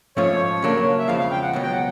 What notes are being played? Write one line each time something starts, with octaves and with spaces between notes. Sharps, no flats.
G#2 F3 A3 C#4 F4 C#5
C#3 F#3 A#3 D4
E5
E2 C#3 F3 G#3 F5
F5
G5
F#5
C#2 B2 F#3
G5
F#5